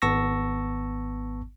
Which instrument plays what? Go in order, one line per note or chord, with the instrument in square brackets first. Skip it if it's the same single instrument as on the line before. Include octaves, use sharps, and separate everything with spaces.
[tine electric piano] G#1 B3 A5 C#6 E6 A#6